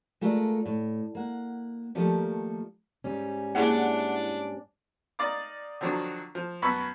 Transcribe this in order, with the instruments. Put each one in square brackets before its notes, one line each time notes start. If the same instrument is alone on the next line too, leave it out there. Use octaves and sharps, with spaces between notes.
[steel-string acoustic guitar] G#3 A3 F4 A4 A#4 D5
A2
A#3 F#5
D#3 F3 G3 A3 A#3 A4
G#2 G3 C#4
[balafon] A#3 G#4 D5 [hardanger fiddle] D4 [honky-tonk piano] E4 F#5
[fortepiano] D#4 D5 F5 D6
D3 D#3 F3 F#3 D4
F3
F#2 B3 A5 B5 C#6 E6